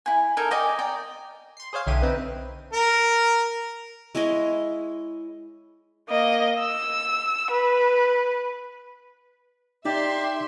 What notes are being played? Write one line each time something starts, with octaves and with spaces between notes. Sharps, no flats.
E4 G#5
D#4 A4 A#4 G#5
D5 D#5 G5 G#5
D5 G5 A#5
C6 C7
G#4 C5 C#5 F5
B1 D3 E4 G4 D#7
C4 D#4 B4
A#4
G#3 E4 C#5 D#5
A#3 D#5
E6
B4
D#4 G4 D5 E5 C6